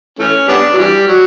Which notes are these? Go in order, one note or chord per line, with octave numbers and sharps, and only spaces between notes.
E3 A3 C#4
G3 B3 D4
F#3
E3 G3
F#3